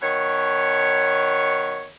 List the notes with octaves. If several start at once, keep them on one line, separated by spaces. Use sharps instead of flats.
B2 D#3 C#5